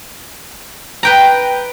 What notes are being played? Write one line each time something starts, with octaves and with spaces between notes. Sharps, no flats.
B4 G5 A#5